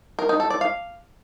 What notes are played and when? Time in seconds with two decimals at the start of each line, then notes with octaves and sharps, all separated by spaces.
0.19 A#4
0.29 D#4
0.40 A4
0.50 D5
0.61 F5